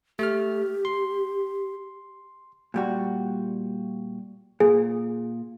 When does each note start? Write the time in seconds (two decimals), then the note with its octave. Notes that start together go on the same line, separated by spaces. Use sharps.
0.19 A3 G4 F6
0.85 C6
2.74 A#2 G3 F#4
4.60 A#2 G#4